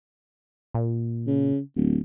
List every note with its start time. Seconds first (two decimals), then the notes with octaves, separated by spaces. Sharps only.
0.74 A#2
1.27 C#3
1.76 D1